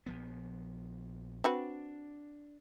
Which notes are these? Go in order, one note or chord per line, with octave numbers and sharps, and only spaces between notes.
A#1 F3 B3
C4 D4 F#4 B4